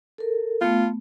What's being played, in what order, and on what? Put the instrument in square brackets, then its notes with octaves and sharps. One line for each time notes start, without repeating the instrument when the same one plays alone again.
[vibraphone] A4 A#4
[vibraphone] A3 B3 [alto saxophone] F4